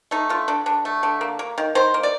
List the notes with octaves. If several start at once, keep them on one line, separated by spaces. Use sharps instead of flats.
A3 D#4
D3 F4
D3 D4
D3 D4
A3
D3
A#3
A#3
D#3
D#3 C5
A#3
D5